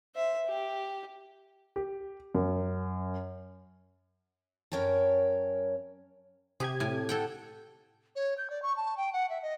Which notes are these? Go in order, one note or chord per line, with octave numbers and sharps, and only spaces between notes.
C5 E5
G4
G4
F#2
F#2 C#4 A#4 C#5 G5 A5
C3 G4 G#4 G#6
A2 G#5
A4 F#5 G5
C#5
G6
D5
C#6
A5
G5
F#5
E5
D#5